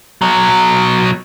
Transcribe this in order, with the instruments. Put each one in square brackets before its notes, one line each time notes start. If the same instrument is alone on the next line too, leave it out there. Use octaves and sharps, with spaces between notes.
[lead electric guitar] B2 F#3